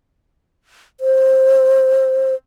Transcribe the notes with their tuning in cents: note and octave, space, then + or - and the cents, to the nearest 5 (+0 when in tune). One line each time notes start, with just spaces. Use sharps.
C5 +15